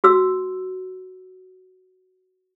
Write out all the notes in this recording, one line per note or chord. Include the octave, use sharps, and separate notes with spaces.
F#4 E6